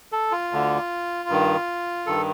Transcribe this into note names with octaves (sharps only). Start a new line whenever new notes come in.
A4
F4
D2 D3
G2 D#3
G2 D#3 A4